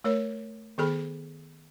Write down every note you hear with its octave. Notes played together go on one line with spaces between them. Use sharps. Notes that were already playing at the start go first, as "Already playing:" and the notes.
A3 A#4 C#5
D#3 B3 G#4 A4 B5